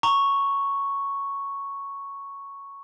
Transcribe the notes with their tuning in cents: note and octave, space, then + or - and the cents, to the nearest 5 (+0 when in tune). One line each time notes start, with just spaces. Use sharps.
A#5 -15 C#6 +0